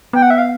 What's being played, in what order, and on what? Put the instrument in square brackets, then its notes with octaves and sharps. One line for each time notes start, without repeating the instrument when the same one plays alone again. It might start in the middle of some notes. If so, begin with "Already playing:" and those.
[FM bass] B3 [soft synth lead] G5
[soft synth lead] F#5
E5
F5